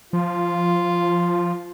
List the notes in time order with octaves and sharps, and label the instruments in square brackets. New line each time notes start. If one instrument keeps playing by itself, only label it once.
[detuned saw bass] F3 [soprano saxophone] F4